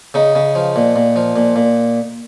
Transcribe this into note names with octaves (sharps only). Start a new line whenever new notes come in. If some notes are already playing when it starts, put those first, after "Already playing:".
C#3 D#4
C#3
F3
A#2
A#2
F3
A#2
A#2